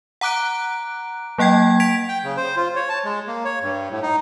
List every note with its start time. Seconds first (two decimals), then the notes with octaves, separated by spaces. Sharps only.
0.21 F#5 A#5 D6 F#6 D7
1.38 F#3 A#3 F#5 G5 G#6
1.80 G#6 B6 D7 F7
2.08 G5
2.24 C#3
2.37 C5
2.56 F4
2.76 C#5
2.89 A5
3.05 G#3
3.27 A#3
3.45 C#5
3.62 G2
3.90 A2
4.02 D#4